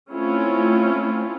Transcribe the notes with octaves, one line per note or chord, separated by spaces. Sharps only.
A3 C4 C#4 E4 F4